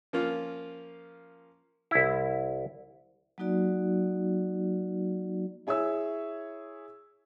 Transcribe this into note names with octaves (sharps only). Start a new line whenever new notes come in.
F3 A#3 C#4 F4
C2 E4
F#3 A#3 D#4 F#4 D5
E4 G#4 C#5 E5 E6